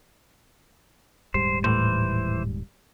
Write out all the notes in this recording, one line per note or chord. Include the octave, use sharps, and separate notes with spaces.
D#1 G#2 G3 C5
A2 E3 C5